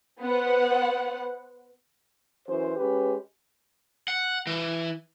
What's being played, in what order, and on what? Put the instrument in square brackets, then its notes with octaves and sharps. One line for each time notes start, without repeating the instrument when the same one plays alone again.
[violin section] B3 C5 F#5
[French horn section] F#2 E3 C5
G#3 C#4 G4 B4
[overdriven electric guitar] F#5
E3